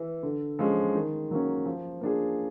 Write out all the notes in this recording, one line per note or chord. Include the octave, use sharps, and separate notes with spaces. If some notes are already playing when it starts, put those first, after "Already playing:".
Already playing: E3
D3
F3 G#3 C#4
D#3
F#3 A#3 C#4
F3
A#3 D4 F4 G#4